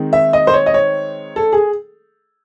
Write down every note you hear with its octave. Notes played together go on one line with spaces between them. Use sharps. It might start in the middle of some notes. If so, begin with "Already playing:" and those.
Already playing: D#3 G#3 C4 D#4
E5
D#5
C5
C#5
D#5
C#5
A4
G#4